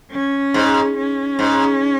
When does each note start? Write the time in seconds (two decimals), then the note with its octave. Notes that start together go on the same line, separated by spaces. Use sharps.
0.11 C#4
0.54 G#2
0.97 C#4
1.39 G#2